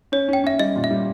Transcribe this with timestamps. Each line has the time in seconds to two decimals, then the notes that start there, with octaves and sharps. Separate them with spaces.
0.12 C#4 C#5
0.28 C#4 G5
0.44 C#4 E5
0.59 G3 D#5
0.76 A#2
0.84 E5
0.91 G3